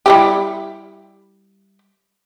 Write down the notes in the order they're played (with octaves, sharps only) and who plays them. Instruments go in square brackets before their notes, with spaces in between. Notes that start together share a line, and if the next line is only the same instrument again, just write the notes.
[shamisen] G3 E4 G4